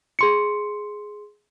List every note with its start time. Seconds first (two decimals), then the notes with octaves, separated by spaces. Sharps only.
0.19 G#4 C6 C#7